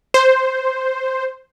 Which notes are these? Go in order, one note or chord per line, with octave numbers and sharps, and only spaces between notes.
C5